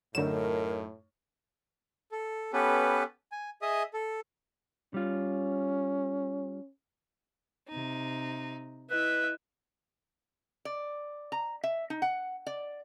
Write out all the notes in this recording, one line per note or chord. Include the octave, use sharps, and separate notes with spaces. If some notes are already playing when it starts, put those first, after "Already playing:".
F#2 A2 D3 A3 D#4 A#4 E7
A4
B3 C#4 G4 A4 B4
G#5
G#4 D#5 E5 D#6
A4
G3 C#4 F4
C3 D#4
E4 B4 D#5 E5
D5
A#5
E5
D#4
F#5
D5